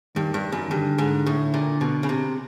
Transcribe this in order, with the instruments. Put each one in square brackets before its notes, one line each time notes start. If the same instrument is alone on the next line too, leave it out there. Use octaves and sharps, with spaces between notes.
[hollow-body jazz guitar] G2 [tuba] D#3
[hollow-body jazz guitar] G2
F#2
[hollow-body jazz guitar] G2 [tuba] D3
[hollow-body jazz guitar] G#2
A2
A#2
B2
C#3
C3